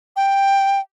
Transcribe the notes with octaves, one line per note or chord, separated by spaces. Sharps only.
G5